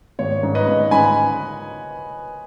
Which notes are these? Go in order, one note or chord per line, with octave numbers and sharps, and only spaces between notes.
G#1 C#5
G#2
B4 D#5
G#1
G#2 G#5 B5